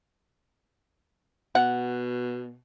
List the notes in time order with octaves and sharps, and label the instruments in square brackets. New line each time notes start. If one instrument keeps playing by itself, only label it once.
[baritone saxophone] B2 [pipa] F#5